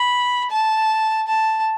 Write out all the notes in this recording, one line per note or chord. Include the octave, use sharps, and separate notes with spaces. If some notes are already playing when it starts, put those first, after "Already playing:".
Already playing: B5
A5
A5